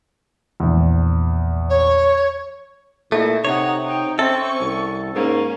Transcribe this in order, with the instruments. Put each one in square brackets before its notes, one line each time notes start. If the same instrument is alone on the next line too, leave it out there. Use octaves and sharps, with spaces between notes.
[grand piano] A#1 E2
[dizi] C#5
[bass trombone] A#2 [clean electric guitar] A3 [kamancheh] E4 [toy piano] A4 E5
[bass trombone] C3 [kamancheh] D#4 F#5 [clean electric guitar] C#5
[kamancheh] D#4 G5
[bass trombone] C4 [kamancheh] C#4 C#6 [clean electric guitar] A4 [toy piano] E5
[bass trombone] C2
[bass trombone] G#2 [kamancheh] A#3 C#4